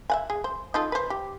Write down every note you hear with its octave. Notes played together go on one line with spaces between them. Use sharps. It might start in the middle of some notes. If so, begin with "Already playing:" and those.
E5 F#5 G#5
G#4
C5
D#4 F4 A4
B4 C5
G4